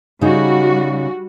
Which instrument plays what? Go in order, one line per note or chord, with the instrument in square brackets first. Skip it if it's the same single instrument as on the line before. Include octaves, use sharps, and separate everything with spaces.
[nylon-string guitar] C#3 D#4 [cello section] G3 F#4